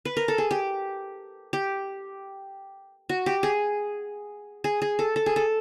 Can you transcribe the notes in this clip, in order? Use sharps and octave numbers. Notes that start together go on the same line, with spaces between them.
B4
A#4
A4
G#4
G4
G4
F#4
G4
G#4
G#4
G#4
A4
A4
G#4
A4